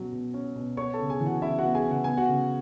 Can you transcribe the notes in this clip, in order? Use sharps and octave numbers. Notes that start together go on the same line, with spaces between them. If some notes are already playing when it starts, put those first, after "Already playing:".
Already playing: B2 F#3 C#4
B2
C#4
B2
B3 C#5 C#6
A4 A5
C#3
G#4 G#5
E3
F#4 F#5
C#3 E4 E5
F#4 F#5
B3
G#4 G#5
C#3
F#5
B3 G#5
F#4 F#5
C#3